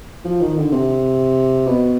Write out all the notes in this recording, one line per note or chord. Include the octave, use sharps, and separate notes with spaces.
F3
D#3
D3
C3
B2